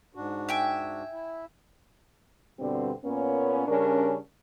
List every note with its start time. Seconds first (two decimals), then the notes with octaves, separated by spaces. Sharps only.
0.15 G#2 D4 F#4
0.49 E5 G5 G#5
1.12 E4
2.59 G2 B2 D3 G3 C4
3.04 A#2 A#3 B3 C#4
3.66 C#3 G3 C#4 D4 A#4